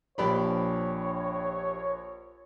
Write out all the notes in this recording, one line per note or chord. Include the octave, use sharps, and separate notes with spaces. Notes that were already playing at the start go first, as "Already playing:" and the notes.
A#1 F3 D4 G4 C#5 B5